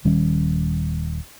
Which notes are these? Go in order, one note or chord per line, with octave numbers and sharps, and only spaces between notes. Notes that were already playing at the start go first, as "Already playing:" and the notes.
D#1 D#3 G3 C#4